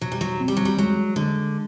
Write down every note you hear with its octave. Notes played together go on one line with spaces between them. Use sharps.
B2 F#3
G3
F#3
C4
G3
F#3
G3
F#3 G#3
D3 G#3